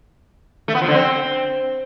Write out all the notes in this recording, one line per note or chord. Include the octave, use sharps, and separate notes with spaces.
A3
B3
F3
D3
C4